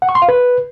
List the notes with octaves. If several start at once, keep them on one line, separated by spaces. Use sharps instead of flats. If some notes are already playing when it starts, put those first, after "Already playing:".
F#5
C#6
C6
F5
B4